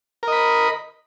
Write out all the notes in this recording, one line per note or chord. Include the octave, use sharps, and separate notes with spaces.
A#4 D#5 B5